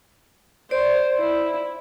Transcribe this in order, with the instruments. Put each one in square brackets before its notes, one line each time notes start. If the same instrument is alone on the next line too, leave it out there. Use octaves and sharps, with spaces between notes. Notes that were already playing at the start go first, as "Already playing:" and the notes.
[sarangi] C5 [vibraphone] D5
[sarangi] E4